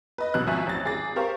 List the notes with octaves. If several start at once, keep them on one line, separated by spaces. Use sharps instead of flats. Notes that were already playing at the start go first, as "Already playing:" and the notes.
B4 D#5
A1 B2 F#6
G#1 F3 F#4 E5 G#5 C#6
A1 A6
G#1 G#4 D6 A6
G4 A#4 C5 F5 C#6